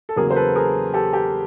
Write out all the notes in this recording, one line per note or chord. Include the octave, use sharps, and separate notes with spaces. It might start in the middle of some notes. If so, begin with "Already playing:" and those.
A4
E2 C#3 F#3 A#3 G#4 A#4
C5
A4 B4
G#4 A#4
G4 A4
G4